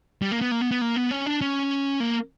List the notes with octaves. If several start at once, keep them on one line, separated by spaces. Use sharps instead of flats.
G3
A#3
B3
A#3
B3
B3
A#3
B3
C#4
D4
C#4
A#3